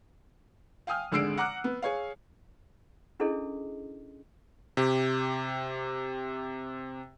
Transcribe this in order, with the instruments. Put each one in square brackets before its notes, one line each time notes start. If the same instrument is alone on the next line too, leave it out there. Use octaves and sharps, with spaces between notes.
[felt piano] F5 G5 G#5 D#6 F6
G#1 D3 G#3 E6 C7 D7
F#5 A#5 D6 F6 F#6
B3
G#4 C#5 F5
[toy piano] C#4 D4 E4 G#4 A4 D#5
[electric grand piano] C3 G4